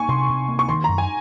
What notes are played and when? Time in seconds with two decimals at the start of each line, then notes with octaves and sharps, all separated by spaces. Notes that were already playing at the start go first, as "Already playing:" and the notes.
Already playing: A#3 G#5 C#6
0.08 C3 C6
0.29 C3
0.49 A#3
0.59 C#6
0.69 D#3 C6
0.84 A#5
0.89 F#2
0.98 G#5